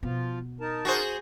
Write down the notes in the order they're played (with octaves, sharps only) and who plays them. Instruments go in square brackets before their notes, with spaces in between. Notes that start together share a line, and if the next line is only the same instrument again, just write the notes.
[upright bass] B2 B3 [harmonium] F3 F4
[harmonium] D#4 A#4 A5
[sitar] F#4 G#4 C5